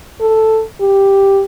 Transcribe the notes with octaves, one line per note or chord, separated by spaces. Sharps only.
A4
G4